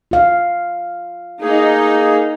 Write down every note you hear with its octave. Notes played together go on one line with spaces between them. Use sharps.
F4 F5
A#3 D#4 G#4